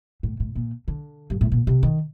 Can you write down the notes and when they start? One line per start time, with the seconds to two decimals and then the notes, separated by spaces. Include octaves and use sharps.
0.23 A2
0.40 A2
0.55 A#2
0.88 D3
1.30 G2
1.41 A2
1.52 A#2
1.67 C3
1.83 D#3